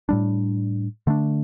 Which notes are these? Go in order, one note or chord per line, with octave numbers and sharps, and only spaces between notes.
A2 G3 D4
D3 A3 D4